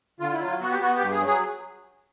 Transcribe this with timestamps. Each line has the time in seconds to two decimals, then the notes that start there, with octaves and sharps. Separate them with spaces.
0.20 D3 F4
0.32 E4
0.40 F#3 F4
0.61 B3 F#4
0.71 G4
0.80 B3 F#4
0.96 G2 G4
1.11 G#4
1.21 F#3
1.27 G#4